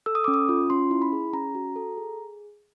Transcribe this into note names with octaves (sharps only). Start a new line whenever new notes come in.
A4 E6
D#6
C#4 D6
D#6
F4
C#4 C6
E4
B5
G#4
C#4 A#5
F#4
A4
G#4